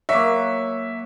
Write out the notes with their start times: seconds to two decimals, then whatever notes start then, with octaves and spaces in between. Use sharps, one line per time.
0.09 F#3 A#3 E5